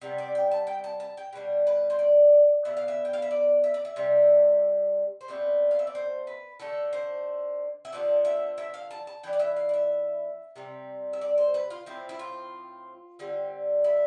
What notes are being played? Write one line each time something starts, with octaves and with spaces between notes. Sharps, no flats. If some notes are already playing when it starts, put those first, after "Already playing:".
C3 G3 B3
D5
G5
A5
G5
A5
A5
G5
B2 G3 D4
B4
C5
D5
B2 B3 D4 E5
F5
E5
G5
F5
E5
D5
E5
D5
E5
C3 G3 D4
C5
B2 A3 C4 D5
F5
E5
D5
C5
B4
D3 A3 D4 A4
C5
E5
D3 F3 B3 D4 D5
E5
E5
F5
A5
A5
E3 B3 D4 G5
D5
E5
F5
D5
E5
C3 G3 C4
E5
D5
C5
B4
F4
A2 F3 C4 E4
E4
F4
D3 G3 C4
E4